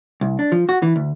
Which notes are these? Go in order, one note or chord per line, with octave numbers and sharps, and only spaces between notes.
C2
D4
F3
F#4
E3
D2